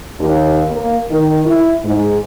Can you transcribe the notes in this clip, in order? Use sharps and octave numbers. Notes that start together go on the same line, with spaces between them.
D#2
A#3
D#3
E4
G#2